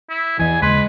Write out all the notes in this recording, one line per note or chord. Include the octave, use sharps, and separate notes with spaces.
E4
E2 E3 E4 D#5 G#5
D#2 C#3 G#3 B4 C6